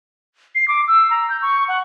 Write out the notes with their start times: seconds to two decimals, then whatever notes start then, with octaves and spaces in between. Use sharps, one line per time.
0.55 C7
0.68 D6
0.88 E6
1.10 A#5
1.30 G6
1.42 C#6
1.68 F#5